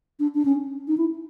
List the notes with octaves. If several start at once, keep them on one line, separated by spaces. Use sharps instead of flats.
D4
D4
C#4
D#4
E4